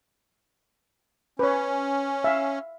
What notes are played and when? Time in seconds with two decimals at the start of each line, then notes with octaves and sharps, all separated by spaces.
1.39 C#4 B4 C#5
2.24 E5 F5